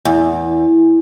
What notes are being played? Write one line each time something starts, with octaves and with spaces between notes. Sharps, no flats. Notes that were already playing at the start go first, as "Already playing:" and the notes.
E2